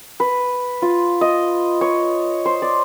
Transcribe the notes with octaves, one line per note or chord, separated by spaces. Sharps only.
B4
F4
D#5
C#5
C5
D5